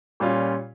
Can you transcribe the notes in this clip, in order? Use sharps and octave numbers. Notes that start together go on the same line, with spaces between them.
A#2 G3 C#4 F4